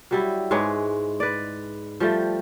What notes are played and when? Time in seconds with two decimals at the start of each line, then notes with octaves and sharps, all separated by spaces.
0.11 F#3 G3 E4
0.51 G#2 G#3 B4 C#5
1.20 B4 D5
2.00 F3 G3 A3